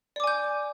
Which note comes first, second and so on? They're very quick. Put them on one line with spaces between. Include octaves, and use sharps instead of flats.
D5 D6 G#5 G6